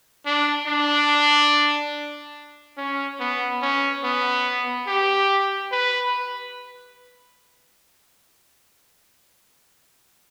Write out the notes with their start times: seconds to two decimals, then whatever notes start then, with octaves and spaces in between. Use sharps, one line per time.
0.26 D4
0.68 D4
2.78 C#4
3.20 B3
3.62 C#4
4.04 B3
4.88 G4
5.72 B4